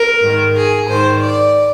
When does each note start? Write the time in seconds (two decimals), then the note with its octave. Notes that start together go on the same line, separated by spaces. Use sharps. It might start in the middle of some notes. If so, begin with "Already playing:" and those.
Already playing: A#4
0.22 G#2 D#3
0.55 G#4
0.87 G#2 D#3 C5
1.20 D5